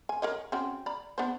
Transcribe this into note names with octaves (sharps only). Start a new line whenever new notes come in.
G#5
A#4 C#5 D#5
C4 C#4 F#4
D5 A#5 B5
B3 D4 C5